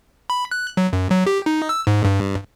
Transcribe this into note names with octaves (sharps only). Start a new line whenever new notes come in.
B5
F#6
F#3
F#2
F#3
G4
D#4
E6
G#2
G2